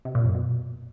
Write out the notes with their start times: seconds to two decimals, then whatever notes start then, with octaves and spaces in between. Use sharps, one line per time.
0.05 C3
0.15 A#2
0.25 F#2
0.34 B2